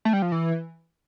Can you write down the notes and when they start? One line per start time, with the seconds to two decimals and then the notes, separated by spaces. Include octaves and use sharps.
0.05 A3
0.13 G3
0.22 F3
0.32 E3